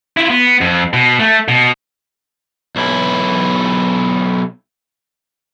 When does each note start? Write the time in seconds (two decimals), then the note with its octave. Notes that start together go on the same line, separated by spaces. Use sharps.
0.17 E4 F4
0.30 B3
0.61 F2
0.93 B2
1.19 A3
1.48 B2
2.76 B1 E4